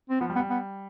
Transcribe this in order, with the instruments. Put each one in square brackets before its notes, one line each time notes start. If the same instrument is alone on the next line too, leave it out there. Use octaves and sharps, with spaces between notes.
[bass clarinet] C4
[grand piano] F3 [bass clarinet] B3
[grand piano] G3
[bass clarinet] B3
[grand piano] G3
[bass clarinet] B3